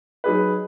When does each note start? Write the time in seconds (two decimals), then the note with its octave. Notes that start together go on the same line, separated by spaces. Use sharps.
0.24 F#3 D#4 G#4 B4